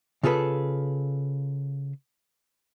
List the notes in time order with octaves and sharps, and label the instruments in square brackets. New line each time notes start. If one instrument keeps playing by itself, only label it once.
[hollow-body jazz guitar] C#3 F4 G#4 A4 B4